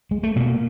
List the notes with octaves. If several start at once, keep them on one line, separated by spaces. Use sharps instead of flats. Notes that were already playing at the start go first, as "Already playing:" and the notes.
G#3
A3
B2 A#3